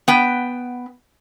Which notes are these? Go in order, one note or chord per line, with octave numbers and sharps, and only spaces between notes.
B3 G5